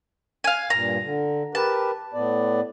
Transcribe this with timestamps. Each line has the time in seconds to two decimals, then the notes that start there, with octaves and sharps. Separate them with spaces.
0.44 F5 G#5
0.70 G2 A#2 A#5
1.03 D3
1.55 G4 A#4 B4 A5
2.14 A2 B3 D5